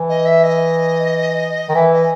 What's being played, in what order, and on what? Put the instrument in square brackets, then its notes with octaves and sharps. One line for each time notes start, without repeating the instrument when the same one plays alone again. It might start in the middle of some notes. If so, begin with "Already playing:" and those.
Already playing: [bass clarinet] E3
[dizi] D#5
E5
D#5
[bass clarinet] D#3
[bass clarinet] E3 [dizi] E5
[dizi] D#5